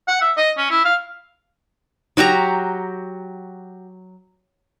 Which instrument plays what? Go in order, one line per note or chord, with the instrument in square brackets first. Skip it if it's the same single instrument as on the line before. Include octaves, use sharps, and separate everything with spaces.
[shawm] F#5
E5
D#5
C#4
E4
F5
[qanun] F#3 F#4 G4 A#5